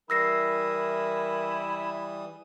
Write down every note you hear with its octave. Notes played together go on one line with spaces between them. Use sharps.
E3 G3 E4 A#4 D#6 E6 A#6 C7